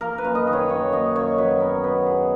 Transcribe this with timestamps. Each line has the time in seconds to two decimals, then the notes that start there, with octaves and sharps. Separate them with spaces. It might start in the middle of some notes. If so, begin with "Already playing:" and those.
0.01 A#3 A#4
0.18 B4
0.24 F#2
0.35 D#5
0.47 D#3
0.53 C#5
0.69 A#3 C#5
0.93 F#2 D#5
1.15 F#2 C#5
1.38 F#3 B4
1.60 B3 A#4
1.84 B3 B4
2.06 F#3 G#4